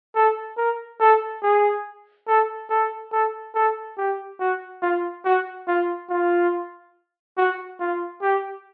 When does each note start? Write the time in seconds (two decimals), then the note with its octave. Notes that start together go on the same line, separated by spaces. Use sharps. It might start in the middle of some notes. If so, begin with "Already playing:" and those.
0.15 A4
0.57 A#4
1.00 A4
1.43 G#4
2.27 A4
2.70 A4
3.12 A4
3.55 A4
3.98 G4
4.40 F#4
4.82 F4
5.25 F#4
5.68 F4
6.09 F4
7.37 F#4
7.80 F4
8.22 G4